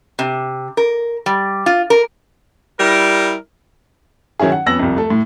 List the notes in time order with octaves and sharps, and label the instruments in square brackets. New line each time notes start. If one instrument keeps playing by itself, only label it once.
[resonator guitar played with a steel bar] C3
A#4
G3
F4
A#4
[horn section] G3 E4 A#4
[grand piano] D#3 F#3 C#4 E4 G#4
F#5
F2 B3 C#4 E6 A#6 F#7
C2 F2
A3 A4
A2